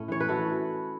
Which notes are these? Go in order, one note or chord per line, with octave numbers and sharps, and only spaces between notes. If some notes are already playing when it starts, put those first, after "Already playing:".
Already playing: A2 A3 C#4
E3 C#5
B4
E4 F#4 A4